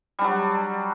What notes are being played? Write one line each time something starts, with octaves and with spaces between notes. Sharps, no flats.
F#3 G3 D4